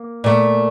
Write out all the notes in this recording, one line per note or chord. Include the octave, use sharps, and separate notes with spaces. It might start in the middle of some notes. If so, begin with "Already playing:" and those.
Already playing: A#3
A#2 A3